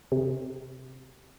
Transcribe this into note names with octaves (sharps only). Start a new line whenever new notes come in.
C3